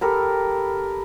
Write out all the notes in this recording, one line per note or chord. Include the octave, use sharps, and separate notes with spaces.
G4 A4 A#4 B5